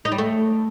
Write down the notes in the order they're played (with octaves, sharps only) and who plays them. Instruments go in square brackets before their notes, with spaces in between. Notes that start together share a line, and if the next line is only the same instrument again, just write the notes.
[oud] D#4
G3
A3